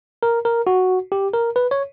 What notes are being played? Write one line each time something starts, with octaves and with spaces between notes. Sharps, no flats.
A#4
A#4
F#4
G4
A#4
B4
C#5